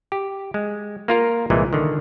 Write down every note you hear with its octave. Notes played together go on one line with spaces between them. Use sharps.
G4
G#3
A#3 F4 A#4
C2 A#2 E3 G#3
D3 D#3